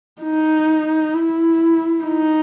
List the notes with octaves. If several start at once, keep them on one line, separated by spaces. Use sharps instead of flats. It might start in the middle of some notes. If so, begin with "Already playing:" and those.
D#4
E4
D#4